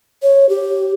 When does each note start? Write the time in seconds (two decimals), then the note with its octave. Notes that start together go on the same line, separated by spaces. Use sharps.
0.23 C#5
0.49 G4